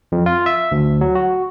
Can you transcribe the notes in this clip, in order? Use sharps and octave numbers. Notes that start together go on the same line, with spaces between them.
F2
F4
E5
D2
F#3
F#4